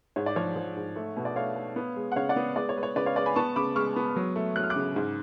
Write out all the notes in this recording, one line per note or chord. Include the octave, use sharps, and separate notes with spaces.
G#2 C#5
D5
F3 C#5
F3
G#2
A3
B2
D5
A3 C#5 F5
A3
B3
G#3
F#5
C#3 C#5 F5
D5 F#5
B3
G#3 B4 D5
C#5
G#3 B4
C#5
C#3 B4 D5
C#5 F5
G#3 B4 D5
G#5 B5
B3 A5 C#6
C#3 B5 D6
G#3 C#6 F6
B3
F#3
A3
F#3 F#6
F6
D6 F#6
C#3
G#2